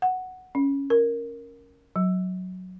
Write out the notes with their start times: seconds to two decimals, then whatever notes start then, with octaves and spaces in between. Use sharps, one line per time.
0.02 F#5
0.55 C#4
0.90 A#4
1.96 F#3